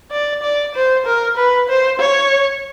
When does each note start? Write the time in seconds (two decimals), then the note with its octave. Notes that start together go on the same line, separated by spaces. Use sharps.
0.11 D5
0.43 D5
0.75 C5
1.06 A#4
1.37 B4
1.68 C5
1.99 C#5